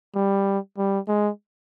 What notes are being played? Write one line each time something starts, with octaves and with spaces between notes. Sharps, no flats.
G3
G3
G#3